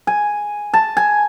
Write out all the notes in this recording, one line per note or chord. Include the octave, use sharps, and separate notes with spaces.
G#5
A5
G#5